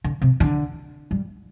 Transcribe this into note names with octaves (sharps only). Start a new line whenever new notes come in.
D3
C3
D3
G3